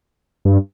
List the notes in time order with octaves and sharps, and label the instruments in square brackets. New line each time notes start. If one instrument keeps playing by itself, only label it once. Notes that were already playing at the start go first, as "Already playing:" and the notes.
[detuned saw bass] G2